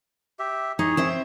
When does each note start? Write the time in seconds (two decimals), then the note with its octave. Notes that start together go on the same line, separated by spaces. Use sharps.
0.39 G4 E5
0.79 D#4 G#4 C#5
0.97 C4 C5 E5